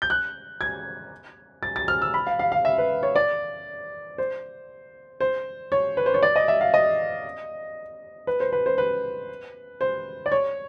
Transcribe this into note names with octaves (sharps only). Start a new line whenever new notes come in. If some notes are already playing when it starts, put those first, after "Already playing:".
G6
F#6
G#6
A6
A6
F6
E6
B5
F5
F5
F5
E5
B4
C#5
D5
C5
C5
C#5
B4
C5
C#5
D5
D#5
E5
F5
D#5
B4
C5
B4
C5
B4
C5
D5
C#5